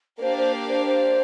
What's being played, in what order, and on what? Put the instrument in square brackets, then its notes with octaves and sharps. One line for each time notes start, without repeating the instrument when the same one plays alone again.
[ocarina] A#4
[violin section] A#3 D4 G4 D5 F5 [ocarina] C5
[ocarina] C5
A#4
C5
C5